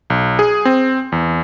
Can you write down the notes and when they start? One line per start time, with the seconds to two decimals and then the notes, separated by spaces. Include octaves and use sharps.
0.10 B1
0.39 G#4
0.65 C4
1.12 E2